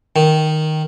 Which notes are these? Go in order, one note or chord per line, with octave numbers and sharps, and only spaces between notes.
D#3